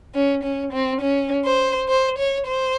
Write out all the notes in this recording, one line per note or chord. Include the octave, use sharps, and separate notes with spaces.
C#4
C#4
C4
C#4
C5
C5
C#5
C5